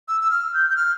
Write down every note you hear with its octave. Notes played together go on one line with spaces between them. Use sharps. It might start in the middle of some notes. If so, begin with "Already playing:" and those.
E6
E6
F6
G6
G6
F6